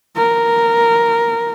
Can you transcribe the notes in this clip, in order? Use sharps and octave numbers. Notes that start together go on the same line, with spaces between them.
A#4